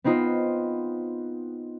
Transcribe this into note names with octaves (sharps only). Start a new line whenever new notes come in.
B3 C4 D#4 F4